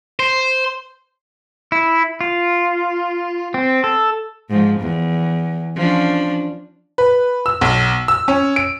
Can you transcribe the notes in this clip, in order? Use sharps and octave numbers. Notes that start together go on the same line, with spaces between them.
C5
E4
F4
C4
A4
G#2 F3
E2
F3 C#4 D4
B4
E6
B1
E6
C#4
D7